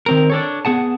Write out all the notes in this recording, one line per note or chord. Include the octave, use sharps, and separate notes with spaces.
D#3 C4 A#4
D4 A4 C#5
B3 G#4 F#5 A5